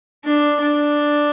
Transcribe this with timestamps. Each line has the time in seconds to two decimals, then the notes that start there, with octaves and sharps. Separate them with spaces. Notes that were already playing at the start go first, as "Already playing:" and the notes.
0.25 D4
0.61 D4